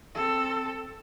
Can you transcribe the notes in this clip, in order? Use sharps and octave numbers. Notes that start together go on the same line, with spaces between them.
C4 A4